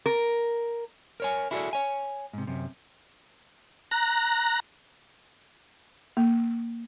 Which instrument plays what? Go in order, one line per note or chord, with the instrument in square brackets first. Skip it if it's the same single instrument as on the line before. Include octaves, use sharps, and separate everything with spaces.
[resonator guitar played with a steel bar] A#4
[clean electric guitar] A#4 C#5 G#5
E4 F#4 G#4 A4 B4 D5
C#5 G#5
G#2 C3
F#2 C3
[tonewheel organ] A#5 F#6 A#6
[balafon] A#3